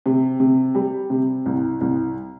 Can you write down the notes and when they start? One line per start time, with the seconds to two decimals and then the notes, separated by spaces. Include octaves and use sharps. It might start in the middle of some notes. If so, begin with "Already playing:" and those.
0.06 C3
0.40 C3
0.75 G3
1.10 C3
1.46 C2
1.81 C2